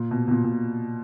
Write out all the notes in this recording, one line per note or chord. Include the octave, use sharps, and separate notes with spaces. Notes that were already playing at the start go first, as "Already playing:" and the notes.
Already playing: A#2
B2
B2
A#2
A#2